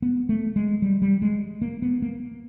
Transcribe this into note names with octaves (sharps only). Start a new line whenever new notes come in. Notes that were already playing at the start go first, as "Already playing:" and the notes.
B3
A3
G#3
G3
G3
G#3
A#3
B3
A#3